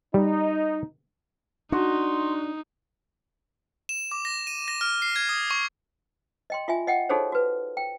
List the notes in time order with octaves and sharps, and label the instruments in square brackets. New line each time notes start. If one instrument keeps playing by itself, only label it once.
[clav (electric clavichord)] G3 [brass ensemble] D#4
[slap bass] D4 [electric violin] D#4 [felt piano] F#4 [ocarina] C6
[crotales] E7
D6
A#6
D#7
A#6
F6
C7
G#6
D#6
C#6
[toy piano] D#5 G5 C6
F4 E5 G#5
D#5 F#5 G5
D#4 F#4 G#4 A4 C5 C#5
F#4 B4
G5